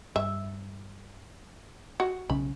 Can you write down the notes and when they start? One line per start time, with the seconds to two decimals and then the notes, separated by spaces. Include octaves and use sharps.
0.16 G2 E5
2.00 F#4
2.30 B1 C#3 C#4 B5